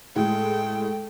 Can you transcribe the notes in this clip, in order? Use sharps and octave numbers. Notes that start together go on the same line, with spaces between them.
A2 G#3 A4 G5